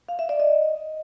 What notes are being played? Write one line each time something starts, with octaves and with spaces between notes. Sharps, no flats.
F5
E5
D5
D#5